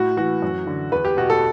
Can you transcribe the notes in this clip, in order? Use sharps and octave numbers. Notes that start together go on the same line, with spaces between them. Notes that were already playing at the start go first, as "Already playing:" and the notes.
Already playing: A2 F#4
E3 F#4
F#2
D3
E2 B4
G4
B2 F#4
A4